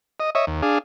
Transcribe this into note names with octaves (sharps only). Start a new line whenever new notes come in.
D#5
C#5 D#5 E5
D#2
D4 G#4 F5